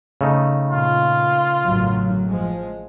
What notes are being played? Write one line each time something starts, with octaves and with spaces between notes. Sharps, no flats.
C#3 A3 D#4
A#2 F4
A1 F#2 F#3
F3 G#3